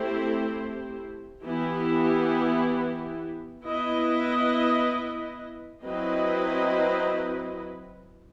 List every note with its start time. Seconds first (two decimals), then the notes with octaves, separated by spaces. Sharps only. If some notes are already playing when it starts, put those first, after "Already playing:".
Already playing: A3 C4 E4 G4 C5
1.45 E3 B3 E4 G4
3.64 B3 E4 B4 D#5
5.84 F#3 C4 E4 B4 D#5